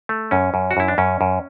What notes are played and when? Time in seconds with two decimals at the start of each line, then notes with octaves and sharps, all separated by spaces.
0.09 A3
0.31 F#2 C#4
0.54 F#2
0.71 F#4
0.77 F#2 E4
0.88 D4
0.98 F#2 C#4
1.21 F#2